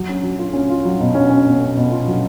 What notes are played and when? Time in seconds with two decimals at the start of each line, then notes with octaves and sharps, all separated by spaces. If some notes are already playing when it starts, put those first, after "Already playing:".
Already playing: F#3
0.09 C#4
0.23 F#3
0.39 F4
0.53 C#4
0.69 F4
0.85 F#3
1.00 B2
1.15 C#4
1.30 C#4
1.46 B2
1.60 C#4
1.77 B2
1.91 F4
2.07 F#3